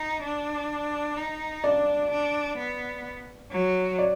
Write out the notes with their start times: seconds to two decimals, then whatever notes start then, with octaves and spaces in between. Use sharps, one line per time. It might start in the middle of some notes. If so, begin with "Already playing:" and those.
Already playing: D#4
0.23 D4
1.17 D#4
1.64 D4 D5
2.11 D4
2.58 B3
3.51 F#3
3.98 D5